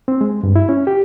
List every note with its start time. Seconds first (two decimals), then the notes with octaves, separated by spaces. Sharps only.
0.08 C4
0.21 G#3
0.43 G2
0.56 E4
0.69 C#4
0.87 G4